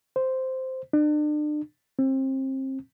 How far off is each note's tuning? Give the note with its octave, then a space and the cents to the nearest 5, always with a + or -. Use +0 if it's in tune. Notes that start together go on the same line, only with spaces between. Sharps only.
C5 -5
D4 +35
C4 +30